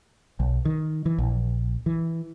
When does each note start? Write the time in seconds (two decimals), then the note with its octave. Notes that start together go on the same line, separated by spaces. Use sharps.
0.40 B1
0.65 D#3
1.06 E3
1.18 A#1
1.86 E3